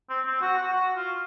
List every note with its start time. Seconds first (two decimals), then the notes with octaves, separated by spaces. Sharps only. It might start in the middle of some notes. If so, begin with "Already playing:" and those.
0.09 C4
0.25 C4
0.41 F#4
0.57 F#4
0.72 F#4
0.96 F4